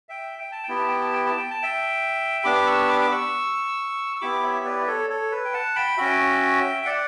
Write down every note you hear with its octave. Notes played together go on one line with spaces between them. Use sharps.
E5 G5
G5
A5
G5
B3 E4 G4
A5
G5
A5
G5
A5
G5
A5
E5 G5
B3 D4 G4 B5 D6
C#6 E6
B5 D6
D6
C#6 E6
E6
B3 E4 G4 B5 D6
C#5 E5
B4 D5
A4 C#5
A4 C#5
B4
G5
F#5 A5
G5 B5
C#4 F#4 E5 G5
D5 F#5